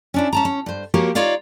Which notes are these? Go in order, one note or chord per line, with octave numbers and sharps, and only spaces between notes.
C#4 D4 E4
C#4 A5 A#5
C#4
G2 C5
F3 A#3 F#4 G4 A#4 C#5
D#4 F4 C#5 D5 F5